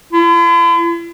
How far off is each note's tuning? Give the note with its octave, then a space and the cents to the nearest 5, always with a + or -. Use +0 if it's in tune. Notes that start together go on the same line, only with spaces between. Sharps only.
E4 +45